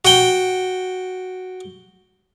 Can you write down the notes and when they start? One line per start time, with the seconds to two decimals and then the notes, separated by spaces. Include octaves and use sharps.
0.05 F#4 G5